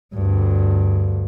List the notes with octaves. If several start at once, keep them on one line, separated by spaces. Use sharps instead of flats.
D2 G2